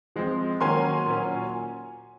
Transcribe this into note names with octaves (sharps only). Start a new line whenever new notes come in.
F3 G#3 C4
D#3 F#3 A#3 C#4 G#5 C6
A#2 F#3 C#4